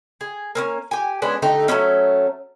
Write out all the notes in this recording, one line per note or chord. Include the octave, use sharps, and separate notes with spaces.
G#4
A#3 C4 C#4
G4 G#5
G#3 B3 C#4 D4
D3 A3 D#4 G4
F#3 A3 B3 C#4